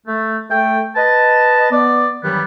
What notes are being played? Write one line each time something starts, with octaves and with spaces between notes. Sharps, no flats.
A3
A3 A4 G5
B4 D#5 A5
B3 D5
G2 D#3 E3 F#3 G3 B3